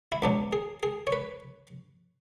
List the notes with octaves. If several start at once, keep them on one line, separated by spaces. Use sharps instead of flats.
E4
C#2 B2 F#3 D4
G#4
G#4
C#5
B4